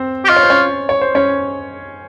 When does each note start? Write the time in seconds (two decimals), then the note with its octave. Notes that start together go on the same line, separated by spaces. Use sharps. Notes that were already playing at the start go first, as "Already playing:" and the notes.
Already playing: C4 C5
0.25 G4
0.29 F4 D#5
0.36 C#5
0.43 C5
0.50 C#4 C#5
0.89 C#5
1.01 C5
1.15 C#4 C#5